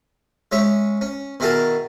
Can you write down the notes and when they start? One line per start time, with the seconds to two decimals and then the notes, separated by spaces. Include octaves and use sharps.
0.52 G#3 C#4 C#5 E5
1.01 C#4
1.40 B2 D#3 E4 G#4 A#4 A5